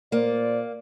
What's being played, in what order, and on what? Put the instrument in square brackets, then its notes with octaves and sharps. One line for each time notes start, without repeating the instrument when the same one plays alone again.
[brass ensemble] A#2 C5 D5 [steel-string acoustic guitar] A#3